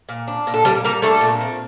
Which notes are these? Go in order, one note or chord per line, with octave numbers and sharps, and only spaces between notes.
A#2
D4
A#2
A4
A#2 G3 G4
G3 A#3 A#4
A3 D4 A4
A#2
C4